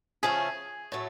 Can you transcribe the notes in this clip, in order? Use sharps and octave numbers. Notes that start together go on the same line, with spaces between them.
C#3 F3 A3 C#4 E4 G#4
A2 F#3 A3